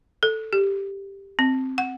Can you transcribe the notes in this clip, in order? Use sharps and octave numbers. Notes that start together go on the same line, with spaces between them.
A4
G4
C4
F#5